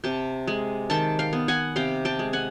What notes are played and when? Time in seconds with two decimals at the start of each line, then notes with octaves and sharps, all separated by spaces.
0.04 C3 G5 A5
0.48 G#3
0.90 D#3 G5 A5
1.19 F5 G5
1.33 B3
1.48 F#5 G#5
1.76 C3 F5 G5
2.05 G5 A5
2.19 G#3
2.33 F#5 G#5